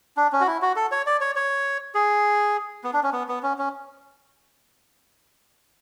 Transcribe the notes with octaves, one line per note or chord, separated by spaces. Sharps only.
D4
C#4
F#4
E4
F#4
A4
C#5
D5
C#5
C#5
G#4
B3
D4
C#4
B3
B3
C#4
C#4